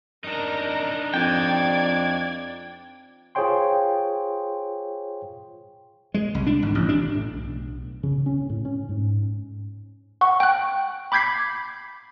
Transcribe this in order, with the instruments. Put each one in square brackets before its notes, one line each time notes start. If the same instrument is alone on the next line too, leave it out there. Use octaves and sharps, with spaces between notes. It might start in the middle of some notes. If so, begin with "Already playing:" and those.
[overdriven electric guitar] D4 D#4 [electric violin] A#4 A#5
[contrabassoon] F2 [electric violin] D5 G#6 [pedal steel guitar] G5
[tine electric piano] F4 G#4 C5 C#5 G5 C6
[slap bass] G#3
C2
D4
G#1
A1
D4
[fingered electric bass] A2
B1
C#3
C#4
A2
C#4
G#2
[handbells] F#5 C#6
G5 F#6
B5 D6 G6 G#6 B6 C7